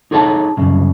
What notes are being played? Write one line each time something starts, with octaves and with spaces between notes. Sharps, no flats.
D#4 G#4 A4 C#5 E5 A5
C2 F#2 C#3